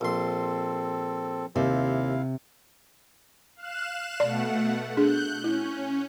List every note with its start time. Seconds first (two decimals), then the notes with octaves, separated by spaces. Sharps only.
0.01 A#1 C4 A4 C6
1.56 D#2 C3 E4 F5
3.56 F5 F#6 E7
4.20 B2 A3 D5 F#5
4.97 D4 G#4 F#6 G6
5.44 C#4 E4